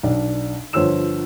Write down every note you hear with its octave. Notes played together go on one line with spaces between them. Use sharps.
B1 D4
G1 F3 C5 C#5 E6 E7